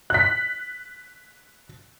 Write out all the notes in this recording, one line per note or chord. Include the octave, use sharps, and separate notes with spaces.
F#6 B6